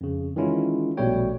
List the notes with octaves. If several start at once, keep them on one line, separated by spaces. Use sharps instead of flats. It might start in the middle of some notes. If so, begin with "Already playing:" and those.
F2 C#3
D#3 E3 G#3 C#4 E4 F4
A#1 B2 G3 A3 C#5 G5